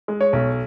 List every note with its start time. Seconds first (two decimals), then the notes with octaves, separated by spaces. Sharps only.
0.08 G#3
0.21 C#5
0.33 B1